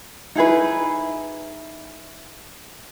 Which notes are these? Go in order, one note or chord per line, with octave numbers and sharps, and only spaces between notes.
D#4 E4 G#4 B4